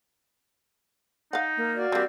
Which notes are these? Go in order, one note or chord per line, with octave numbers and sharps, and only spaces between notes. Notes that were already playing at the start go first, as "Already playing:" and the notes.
D#4 F5 F#5
A#3
F#4 D5 F5
G3 A#3 C4 G4